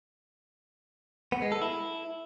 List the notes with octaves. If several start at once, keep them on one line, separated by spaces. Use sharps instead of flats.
B3
G#3
A4
E4